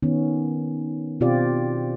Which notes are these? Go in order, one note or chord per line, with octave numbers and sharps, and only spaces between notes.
D#3 B3 C#4
B2 C4 F4 G4 D5